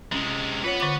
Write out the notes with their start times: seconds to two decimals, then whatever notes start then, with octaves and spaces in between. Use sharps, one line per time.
0.12 C3 G#3 C#4
0.64 F4 B4 C#5 F#5
0.80 D3 D6